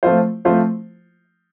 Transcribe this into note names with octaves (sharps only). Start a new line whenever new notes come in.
F3 A3 C4 F4 C5
F3 A3 C4 F4 C5